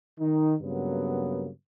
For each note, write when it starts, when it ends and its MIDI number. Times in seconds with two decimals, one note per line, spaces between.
0.20 0.55 51
0.20 0.55 63
0.62 1.50 43
0.62 1.50 49
0.62 1.50 54
0.62 1.50 58
0.62 1.50 59